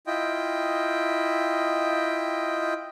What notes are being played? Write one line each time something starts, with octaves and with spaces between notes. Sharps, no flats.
E4 F4 D#5 G5